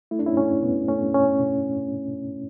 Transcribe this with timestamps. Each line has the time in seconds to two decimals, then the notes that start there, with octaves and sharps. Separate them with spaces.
0.11 A3 E4
0.19 D4
0.26 C#4 E4
0.37 A3 C#4
0.62 B2 B3
0.88 A3 C#4
1.14 B2 C#4
1.40 B2